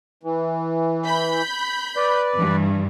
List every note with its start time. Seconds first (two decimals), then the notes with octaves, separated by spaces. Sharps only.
0.23 E3
1.06 B5 G6
1.97 B4 D5
2.36 G2 E3